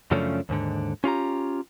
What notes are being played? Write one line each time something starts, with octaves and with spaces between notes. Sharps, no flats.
F#2 C#3 F3 A3 C#4 D4
D#2 G#2 D3
C#4 F4 G4 A#5